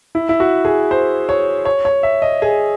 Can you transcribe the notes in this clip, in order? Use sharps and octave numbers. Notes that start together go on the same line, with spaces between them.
E4
E4
F#4
G#4
C5
C#5
C#5
C#5
E5
D#5
G#4